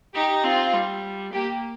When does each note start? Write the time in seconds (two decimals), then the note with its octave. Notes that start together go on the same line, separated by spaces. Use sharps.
0.14 D#4 G4
0.44 C4 F4
0.73 G3
1.33 A#3 G4